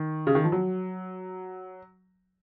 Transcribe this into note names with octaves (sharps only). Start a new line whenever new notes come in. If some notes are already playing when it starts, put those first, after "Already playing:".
Already playing: D#3
C#3
D#3
F3
F#3